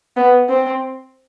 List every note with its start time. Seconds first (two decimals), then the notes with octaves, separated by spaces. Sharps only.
0.17 B3
0.49 C4